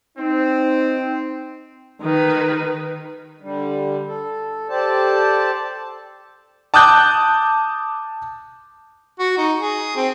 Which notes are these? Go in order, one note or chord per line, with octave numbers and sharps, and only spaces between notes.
C4 D#4
D#3 B4
D3 G3
A4
G4 A4 C5 D5 A5
A5 D6 D#6 F#6 G6
F#4
D#4
G#4
C4